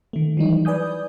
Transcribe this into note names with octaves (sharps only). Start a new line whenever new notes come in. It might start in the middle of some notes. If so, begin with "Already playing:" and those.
D#3 A3
E3 F#3 G3 D#4
B4 D5 G#5 D#6 G6